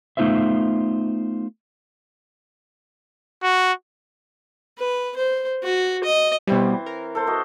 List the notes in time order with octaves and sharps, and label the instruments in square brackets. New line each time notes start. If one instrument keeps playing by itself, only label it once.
[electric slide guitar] A3 B3 D#4 F4 C5 E5
[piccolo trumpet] F#4
[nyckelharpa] B4
C5
F#4
D#5
[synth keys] B2 G3 [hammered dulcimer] E3 C4
[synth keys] A#4
[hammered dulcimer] A4 C5
F#4 D#5